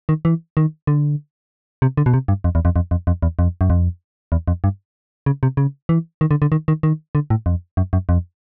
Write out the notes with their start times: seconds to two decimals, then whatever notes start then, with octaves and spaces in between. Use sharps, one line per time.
0.09 D#3
0.25 E3
0.57 D#3
0.87 D3
1.82 C3
1.97 D3
2.06 B2
2.14 C3
2.28 G2
2.44 F2
2.55 E2
2.65 F2
2.76 F2
2.91 F2
3.07 F2
3.22 E2
3.39 F2
3.61 F#2
3.70 F2
4.32 E2
4.48 F2
4.64 G2
5.26 C#3
5.43 C3
5.57 C#3
5.89 E3
6.21 D#3
6.31 D3
6.42 D3
6.52 D#3
6.68 D#3
6.83 D#3
7.15 D3
7.30 A2
7.46 F2
7.77 F#2
7.93 F#2
8.09 F2